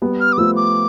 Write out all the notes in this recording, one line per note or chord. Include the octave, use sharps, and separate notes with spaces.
G3 B3
F6
D6
F3 A3 E6
D6